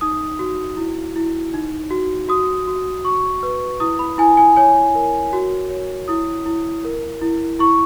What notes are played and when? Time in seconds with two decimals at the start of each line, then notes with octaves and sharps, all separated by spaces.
0.01 D#4 D#6
0.39 F#4
0.77 E4
1.16 E4
1.54 D#4
1.91 F#4
2.29 F#4 D#6
2.67 F#4
3.05 F#4 C#6
3.43 B4
3.80 E4 D#6
3.99 B5
4.18 E4 G#5
4.37 G#5
4.56 C#5 G#5
4.95 A#4
5.33 F#4
5.70 C#5
6.08 E4 D#6
6.46 E4
6.85 A#4
7.21 E4
7.59 E4 C#6